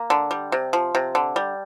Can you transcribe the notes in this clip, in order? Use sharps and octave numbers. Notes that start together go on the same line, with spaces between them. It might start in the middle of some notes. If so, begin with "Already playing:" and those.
Already playing: A#3
D3
G3
C3
F3
C3
D3
G3